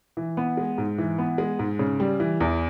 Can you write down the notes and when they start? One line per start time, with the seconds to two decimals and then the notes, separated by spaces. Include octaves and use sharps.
0.17 E3
0.37 B3
0.57 G#3
0.78 G#2
0.98 E3
1.18 B3
1.38 G#3
1.59 G#2
1.79 C#3
2.00 G3
2.20 E3
2.40 E2